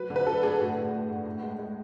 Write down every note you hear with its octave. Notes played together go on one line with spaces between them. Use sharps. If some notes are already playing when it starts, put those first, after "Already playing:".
Already playing: F#3 B4
D3
B4
F#3 A4
D3 G#4
A2 F#4
A2
A3
A2
A2
G#3
G#3